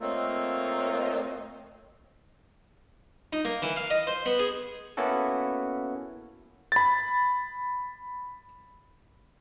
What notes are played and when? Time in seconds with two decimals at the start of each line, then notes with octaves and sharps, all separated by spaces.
0.01 A3 A#3 C4 F4 C#5 D#5
3.33 D#4
3.45 A#3
3.62 E3
3.76 F5
3.90 D#5
4.07 C5
4.26 B3
4.39 G#4
4.97 A#3 B3 C#4 E4 F#4 A4
6.72 B5 A6